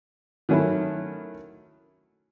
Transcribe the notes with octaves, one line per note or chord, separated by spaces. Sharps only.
D#3 F#3 A3 C#4 E4